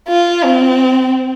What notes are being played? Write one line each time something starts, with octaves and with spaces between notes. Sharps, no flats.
F4
C4